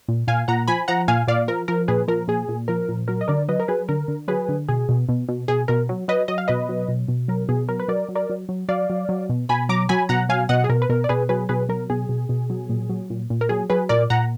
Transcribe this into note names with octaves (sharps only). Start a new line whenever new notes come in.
A#2
A#2 F5 G#5
A#2 F#5 A#5
F3 G#5 B5
F3 F#5 A#5
A#2 F5 G#5
A#2 D5 F5
F3 A#4
F3 A#4
A#2 G#4 B4
F3 A#4
A#2 G#4
A#2
F3 A#4
A#2
F#3 A#4
D#5
D3 A#4 D5
F#3 B4 D#5
A#4
F#3 G#4 B4
D3 A#4
D3
F#3 G#4 B4
D3
B2 G#4
B2
B2
B2
B2 G#4
B2 A#4
F#3
F#3 B4 D#5
F#3 D#5
F5
B2 B4 D#5
F#3
B2
B2
F#3 A#4
B2 G#4
F#3 A#4
B4
F#3 A#4 D5
F#3
A#4 D5
F#3
F#3
F#3 D5 F5
F#3
F#3
B2
B2 G#5 B5
F#3 A#5 D6
F#3 G#5 B5
B2 F#5 A#5
F#3 F5 G#5
B2 D#5 F#5
G#4
B2 A#4
B4
B2 A#4
D5
B2 G#4 B4
F#3 G#4 B4
B2 G#4 B4
F#3 A#4
B2 G#4
B2
B2
F#3
A#2
F#3
A#2
A#2
A#4
F#3 G#4
F#3 G#4 B4
A#2 A#4 D5
A#2 F#5 A#5